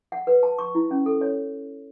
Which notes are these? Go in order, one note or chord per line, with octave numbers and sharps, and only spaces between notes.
F#5
B4
A5
C#6
E4
C#4
A4
C#5